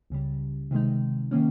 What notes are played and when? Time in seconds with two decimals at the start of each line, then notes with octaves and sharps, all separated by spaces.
0.10 C#2 C#3 G3
0.71 C3 D#3 G#3 D#4
1.31 D#3 A#3 C#4